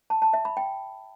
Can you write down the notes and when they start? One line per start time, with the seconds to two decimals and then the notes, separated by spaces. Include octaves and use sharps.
0.10 A5
0.22 A5
0.33 E5
0.45 B5
0.57 G5